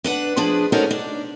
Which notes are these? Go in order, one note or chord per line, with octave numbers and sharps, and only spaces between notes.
D4 B4 F#5
F3 D4 G#4 B4
C#4 D#4 F#4 A4 A#4 C5
D4